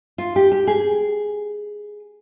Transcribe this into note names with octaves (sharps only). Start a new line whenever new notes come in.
F4
G4
G4
G#4